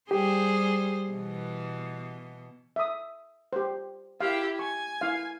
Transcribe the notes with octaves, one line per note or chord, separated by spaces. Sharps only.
G3 G4 G#4 C5
B2 E3
E5 D#6
G4 C5
E4 G4 F5
G#5 C#6
E4 F5